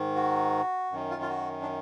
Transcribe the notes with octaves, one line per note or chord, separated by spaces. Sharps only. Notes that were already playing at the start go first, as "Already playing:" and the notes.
Already playing: G#2 D#3
F#4
F#2 D#3
F4
F4
F#4
D4